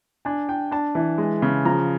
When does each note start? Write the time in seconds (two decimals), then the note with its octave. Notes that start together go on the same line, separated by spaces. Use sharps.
0.25 D4 G#5
0.49 D4 G5
0.71 D4 A5
0.95 E3
1.18 G#3
1.42 C#3
1.65 F3 A#5